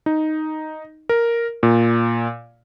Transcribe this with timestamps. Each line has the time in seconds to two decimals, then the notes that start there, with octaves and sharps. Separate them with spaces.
0.06 D#4
1.09 A#4
1.63 A#2